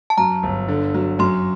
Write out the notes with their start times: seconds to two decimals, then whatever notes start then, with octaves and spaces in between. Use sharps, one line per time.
0.10 A5
0.18 F#2 A#5
0.43 G1
0.68 D3
0.94 F#3
1.19 F#2 C6